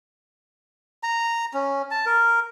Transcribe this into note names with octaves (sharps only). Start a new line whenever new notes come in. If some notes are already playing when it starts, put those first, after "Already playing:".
A#5
C#4
A5
A#4